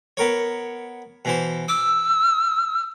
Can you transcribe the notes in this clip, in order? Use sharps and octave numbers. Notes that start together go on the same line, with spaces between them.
B3 A#4 C#5
B2 E3 C5
D6 E6